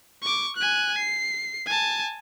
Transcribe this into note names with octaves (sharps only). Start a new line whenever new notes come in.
C#6 D6
G#5 F#6
C7
G#5 A5